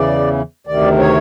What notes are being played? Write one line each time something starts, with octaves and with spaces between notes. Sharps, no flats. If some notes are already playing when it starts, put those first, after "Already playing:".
Already playing: E2 C#3 E3 D5
D2 C3 D#3 D5
C#5